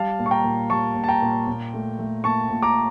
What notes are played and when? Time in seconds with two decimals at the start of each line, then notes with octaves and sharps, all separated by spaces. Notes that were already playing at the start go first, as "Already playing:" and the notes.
Already playing: G3 F5 A5
0.19 A#2
0.26 C#6
0.31 G5 A#5
0.44 A#2
0.70 G3 A5 C#6
0.95 A#2
1.04 A5
1.08 G5 A#5
1.22 A#2
1.48 A#2
1.74 A3
1.99 A3
2.24 A#2 A5 C#6
2.51 A#2
2.62 A#5 D6